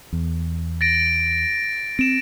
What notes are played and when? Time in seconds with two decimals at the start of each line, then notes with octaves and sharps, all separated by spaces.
0.13 E2
0.81 A6 A#6 D7
1.99 C4 D7 E7